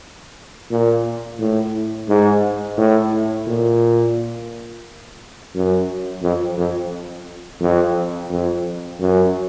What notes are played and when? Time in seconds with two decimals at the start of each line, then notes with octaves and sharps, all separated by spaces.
0.71 A#2
1.39 A2
2.08 G#2
2.77 A2
3.47 A#2
5.55 F#2
6.23 F2
6.58 F2
7.61 F2
8.30 F2
9.00 F#2